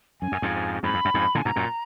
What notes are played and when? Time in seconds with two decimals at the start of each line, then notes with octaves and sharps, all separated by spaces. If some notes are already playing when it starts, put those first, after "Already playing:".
0.21 F#2 G#5
0.32 F#2
0.42 F2 G#2
0.83 F2 G#2 B5
0.94 F2
1.05 F#2
1.14 F2 G#2
1.35 A#2 D3 G#5
1.45 G#2 B2 A#5
1.56 F#2 A#2